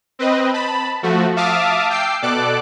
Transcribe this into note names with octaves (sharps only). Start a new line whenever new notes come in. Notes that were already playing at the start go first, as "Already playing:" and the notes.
C4 B4 D#5
A5 B5
F3 A3 F#4
E5 F5 A5 D6 D#6 F6
G5 D6 E6 C7
B2 A4 D5 D6 F#6